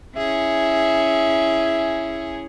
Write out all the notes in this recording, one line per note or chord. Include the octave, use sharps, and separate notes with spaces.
C#4 E4 G#4 E5